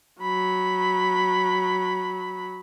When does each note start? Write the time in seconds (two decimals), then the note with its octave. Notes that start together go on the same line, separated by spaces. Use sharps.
0.22 F#3 B5